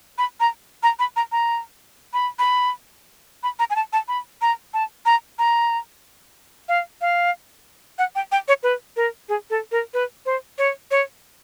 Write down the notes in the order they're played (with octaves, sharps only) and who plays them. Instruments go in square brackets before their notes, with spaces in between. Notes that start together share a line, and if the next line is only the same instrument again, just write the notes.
[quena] B5
A#5
A#5
B5
A#5
A#5
B5
B5
B5
A#5
G#5
A5
A5
B5
A#5
A5
A#5
A#5
F5
F5
F#5
G5
G5
C#5
B4
A#4
G#4
A4
A#4
B4
C5
C#5
C#5